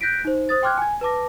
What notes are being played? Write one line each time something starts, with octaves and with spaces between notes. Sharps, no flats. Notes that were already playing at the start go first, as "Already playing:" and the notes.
F#6 G6 A#6 B6 D7
D#4 C5
C5 D#6 A6
G5 C6 D6 F6 F#6 G#6
G#5 G#6
B4 A5 D6 A#6